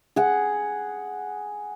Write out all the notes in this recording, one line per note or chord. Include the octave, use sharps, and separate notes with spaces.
G#4 F#5